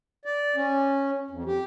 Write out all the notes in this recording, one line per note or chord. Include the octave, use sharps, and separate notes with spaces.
D5
C#4
F2
G4